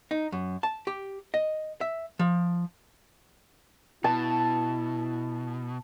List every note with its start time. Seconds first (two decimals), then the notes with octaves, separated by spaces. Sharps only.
0.11 D#4
0.32 F#2
0.63 A5
0.87 G4
1.34 D#5
1.81 E5
2.19 F3
4.04 B2 E4 A5